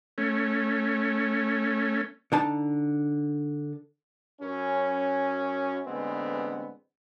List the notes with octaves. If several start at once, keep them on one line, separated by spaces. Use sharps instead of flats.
A3 C#4
D3 D#4 A5
F#2 C#4
A1 D3 G#3 B3 C4